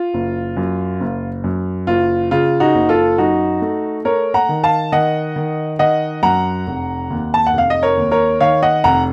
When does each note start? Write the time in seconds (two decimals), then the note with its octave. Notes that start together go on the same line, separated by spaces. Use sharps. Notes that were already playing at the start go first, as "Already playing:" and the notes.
Already playing: F4
0.14 F#1
0.57 F#2
1.00 F#1
1.44 F#2
1.87 F#1 F4
2.31 C#3 F4
2.60 D#4 F#4
2.74 F#1
2.89 F4 A4
3.18 F#2 D#4 F#4
3.62 A3
4.05 A3 A#4 C#5
4.34 F#5 A#5
4.49 D#3
4.63 F5 A5
4.92 D#3 D#5 F#5
5.36 D#3
5.79 D#3 D#5 F#5
6.23 F#2 F#5 A#5
6.67 F1
7.10 D#2
7.34 A5
7.46 F#5
7.53 F1 F5
7.70 D#5
7.83 A#4 C#5
7.97 D#2
8.11 A#4 C#5
8.40 D#3 C#5 F5
8.63 D#5 F#5
8.84 F1 F#5 A#5